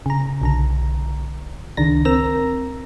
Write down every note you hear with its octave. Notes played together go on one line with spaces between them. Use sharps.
C#3 A#5
B1 D3 A#5
C#2 D#3 D4 A#6
C4 A#4 A#5 E6 A#6